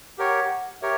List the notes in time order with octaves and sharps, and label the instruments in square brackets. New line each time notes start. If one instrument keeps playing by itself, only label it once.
[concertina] G4 A#4 C#5 [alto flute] F#5
[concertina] G4 A#4 C#5 [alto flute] E5